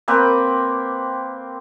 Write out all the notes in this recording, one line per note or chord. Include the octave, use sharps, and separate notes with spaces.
A#3 C4 B4 G5